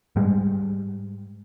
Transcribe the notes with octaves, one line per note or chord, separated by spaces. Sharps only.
G#2 G3 G#3